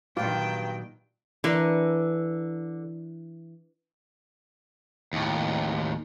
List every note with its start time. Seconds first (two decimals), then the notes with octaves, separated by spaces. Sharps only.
0.17 G2 A#2 D#3 F#3 F4 G5
1.44 D3 E3 A#4
5.13 D#2 A2